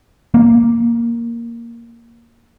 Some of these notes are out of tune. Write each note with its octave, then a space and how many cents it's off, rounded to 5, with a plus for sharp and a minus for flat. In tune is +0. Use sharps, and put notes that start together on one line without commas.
A#3 +0